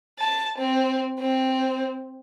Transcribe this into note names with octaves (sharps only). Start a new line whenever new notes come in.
A5
C4
C4